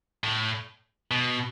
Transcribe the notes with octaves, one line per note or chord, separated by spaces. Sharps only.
A2
B2